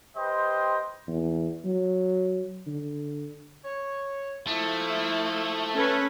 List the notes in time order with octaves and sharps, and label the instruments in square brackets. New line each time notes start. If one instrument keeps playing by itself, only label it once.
[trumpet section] G4 B4 C5 D#5 G5 C6
[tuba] E2
F#3
D3
[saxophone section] C#5
[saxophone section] F3 E4 [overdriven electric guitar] A3
[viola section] C#4 A4 B4